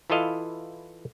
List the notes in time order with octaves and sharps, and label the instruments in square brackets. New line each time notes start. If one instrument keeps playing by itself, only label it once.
[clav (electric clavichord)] E3 E4 F4 A4 D#5 F5